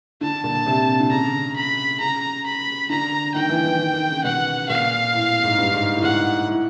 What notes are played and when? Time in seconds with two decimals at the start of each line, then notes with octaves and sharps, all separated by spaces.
0.21 D3 A5
0.44 A#2
0.66 C3
1.00 D3
1.11 C#3 A#5
1.56 B5
2.00 C#3 A#5
2.46 B5
2.90 D3 A#5
3.34 D#3 G5
3.49 E3
3.65 E3
3.79 D#3
3.94 D#3
4.10 C#3
4.24 B2 F#5
4.69 A#2 F5
5.13 A2
5.28 A2
5.44 G#2
5.58 G2
5.74 G#2
5.95 A2
6.03 G#2 F#5
6.47 A2